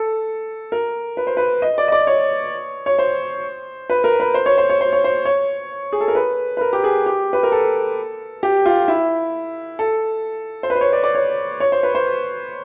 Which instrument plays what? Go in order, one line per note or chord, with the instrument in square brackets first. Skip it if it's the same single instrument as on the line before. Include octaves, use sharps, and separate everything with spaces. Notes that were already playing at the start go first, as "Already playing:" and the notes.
Already playing: [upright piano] A4
A#4
B4
C5
B4
D#5
D5
D#5
D5
C#5
C#5
C5
B4
A#4
B4
C5
C#5
C5
C#5
C5
C#5
C5
C#5
G#4
A4
A#4
B4
B4
A#4
G4
G#4
G4
B4
A#4
A4
G4
F4
E4
A4
C5
B4
C5
C#5
D5
D5
C#5
C#5
C5
B4
C5